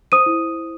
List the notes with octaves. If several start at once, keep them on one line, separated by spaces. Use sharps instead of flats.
C5 D#6 D#7
E4